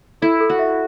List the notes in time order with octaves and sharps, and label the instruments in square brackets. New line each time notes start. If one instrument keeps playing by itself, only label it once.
[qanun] E4 [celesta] A4
[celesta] A4
[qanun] F#4
[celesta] E5